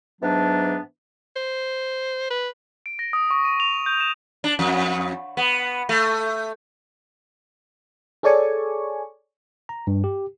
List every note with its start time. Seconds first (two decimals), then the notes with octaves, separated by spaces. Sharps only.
0.22 G#2 E3 F#3 B3 D4
1.36 C5
2.31 B4
2.86 D7
2.99 A#6
3.13 D#6
3.31 C#6
3.45 D#7
3.60 F7
3.86 G6
4.00 E7
4.44 D4
4.59 F2
5.37 B3
5.89 A3
8.23 G#4 A4 C#5 D5 G#5 C#6
9.69 A#5
9.87 G2
10.04 G4